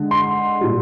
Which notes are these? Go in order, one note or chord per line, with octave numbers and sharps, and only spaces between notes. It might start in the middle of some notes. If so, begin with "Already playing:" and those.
Already playing: D3 G#3
C6
A#2 G3